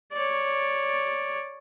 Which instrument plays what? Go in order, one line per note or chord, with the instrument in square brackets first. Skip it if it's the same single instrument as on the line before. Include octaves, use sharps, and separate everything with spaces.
[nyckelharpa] C#5 D5